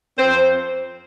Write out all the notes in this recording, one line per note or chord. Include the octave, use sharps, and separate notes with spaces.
F2 C4 C5